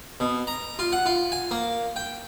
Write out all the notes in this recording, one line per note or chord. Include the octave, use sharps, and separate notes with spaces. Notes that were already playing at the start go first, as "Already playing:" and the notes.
B2
A#5
F4
F#5
F4
G#5
A#3
G5